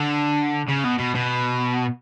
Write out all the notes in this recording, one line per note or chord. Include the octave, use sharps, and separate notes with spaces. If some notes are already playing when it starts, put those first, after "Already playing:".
Already playing: D3
C#3
B2
B2
B2